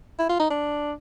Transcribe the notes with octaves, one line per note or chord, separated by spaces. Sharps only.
E4
F4
D#4
D4